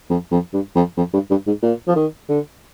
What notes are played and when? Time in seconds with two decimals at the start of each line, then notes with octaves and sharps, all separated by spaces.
0.10 F2
0.31 F2
0.53 G2
0.76 F2
0.97 F2
1.13 G2
1.30 G2
1.47 G#2
1.63 A#2
1.88 F3
1.96 D#3
2.29 D3